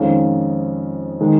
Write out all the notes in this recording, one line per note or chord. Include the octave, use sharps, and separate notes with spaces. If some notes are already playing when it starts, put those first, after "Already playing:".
Already playing: F2 D#3 G#3 C#4 F4
D#3 G#3